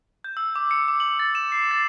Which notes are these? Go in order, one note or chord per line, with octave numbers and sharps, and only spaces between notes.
G6
E6
D6
C#7
D6
F#7
A6
E7
C7
A6